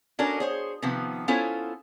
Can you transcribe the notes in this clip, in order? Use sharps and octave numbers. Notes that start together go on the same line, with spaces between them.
C#4 D4 F#4 A4 A#4
G#4 C5 C#5
C3 D#3 F3 B3
B3 C#4 E4 F4 A4 C5